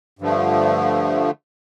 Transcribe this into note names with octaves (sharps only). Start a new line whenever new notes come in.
G2 D3 F3 A3